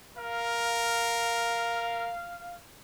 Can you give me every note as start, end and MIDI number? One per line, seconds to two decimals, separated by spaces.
0.18 2.12 70
0.18 2.60 77